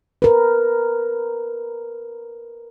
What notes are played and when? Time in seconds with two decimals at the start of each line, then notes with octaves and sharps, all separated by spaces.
0.22 A#4 B4